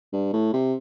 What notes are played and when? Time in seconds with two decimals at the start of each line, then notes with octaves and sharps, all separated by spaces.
0.12 G2
0.33 A2
0.53 C3